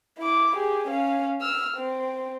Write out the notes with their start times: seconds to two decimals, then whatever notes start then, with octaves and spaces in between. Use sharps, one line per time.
0.18 E4 D6
0.56 G4 G#4
0.88 C#4 F5
1.41 E6 F6
1.77 C4